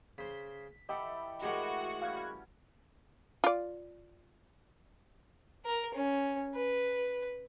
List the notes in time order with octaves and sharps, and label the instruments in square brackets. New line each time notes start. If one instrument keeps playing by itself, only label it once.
[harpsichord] C#3 C5 C6 [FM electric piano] B6
[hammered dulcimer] E3 A4 [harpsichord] G4 E5 F#5 [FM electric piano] D#5 G5 B5
[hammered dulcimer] A2 [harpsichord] G#3 G4 A#4 [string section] F#4
[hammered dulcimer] G3 C#4 [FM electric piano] F5 F#6 G#6
[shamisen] F4 D5
[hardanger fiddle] A#4
C#4
B4